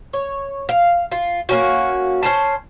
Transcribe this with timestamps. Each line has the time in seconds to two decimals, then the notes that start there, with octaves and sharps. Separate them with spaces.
0.13 C#5
0.69 F5
1.12 F4
1.49 A#3 C#4 F#4
2.23 C#4 C5 A5